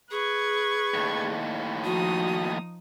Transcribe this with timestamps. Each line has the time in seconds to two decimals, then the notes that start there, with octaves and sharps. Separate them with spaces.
0.11 G#4 B4 C#6 G#6
0.94 D#2 A2
1.84 F3 D#4 F#4 D#6